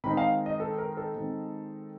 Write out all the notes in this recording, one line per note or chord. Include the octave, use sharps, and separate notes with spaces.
D#3 G#3 C4 D#4 B5
F5
D#5
A4
A#4
A4
D#3 G#3 C4 D#4